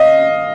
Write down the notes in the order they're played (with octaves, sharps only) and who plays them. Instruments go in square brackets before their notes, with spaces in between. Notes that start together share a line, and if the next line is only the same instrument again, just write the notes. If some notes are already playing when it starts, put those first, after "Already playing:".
Already playing: [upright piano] D#5 F5